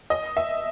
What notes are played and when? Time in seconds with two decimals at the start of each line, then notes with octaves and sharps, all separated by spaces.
0.10 D#5
0.37 E5